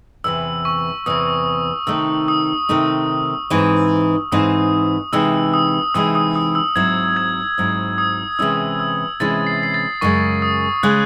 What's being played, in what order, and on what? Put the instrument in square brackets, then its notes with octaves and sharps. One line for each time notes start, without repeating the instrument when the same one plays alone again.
[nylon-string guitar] E2 C3 E3 [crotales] E6
[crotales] C#6
[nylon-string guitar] E2 C3 E3 [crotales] D#6
[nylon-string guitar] C3 D#3 A3 D#4 [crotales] E6
[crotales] D#6
[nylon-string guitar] C3 D#3 A3 D#4
G#2 E3 C4 D#4
[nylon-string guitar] G#2 E3 C4 D#4 [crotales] D#6
[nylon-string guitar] C3 E3 G#3 D#4 [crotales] E6
[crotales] D#6
[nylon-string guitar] C3 E3 G#3 D#4 [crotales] D#6
[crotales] D#6
D#6
E6
[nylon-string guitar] G#2 F#3 C4 E4 [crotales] G#6
[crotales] G#6
[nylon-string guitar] G#2 F#3 C4 E4
[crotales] D#6
[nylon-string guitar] C3 E3 G#3 C#4 E4 [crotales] E6
[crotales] E6
[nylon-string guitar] C3 E3 G#3 C#4 E4 [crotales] A6
[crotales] C7
C7
A6
[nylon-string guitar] F#2 C#3 G#3 [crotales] C#6
[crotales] D#6
[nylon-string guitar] C#3 G#3 [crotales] F#6